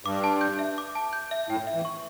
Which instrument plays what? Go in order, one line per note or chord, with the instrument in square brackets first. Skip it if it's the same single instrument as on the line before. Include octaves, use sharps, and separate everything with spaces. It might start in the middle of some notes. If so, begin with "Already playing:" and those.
[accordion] G2 [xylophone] D6
[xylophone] A5
G6
E5
D6
A5
G6
E5
[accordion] A2 [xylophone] G5
[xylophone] E5
[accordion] E3
[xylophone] C#6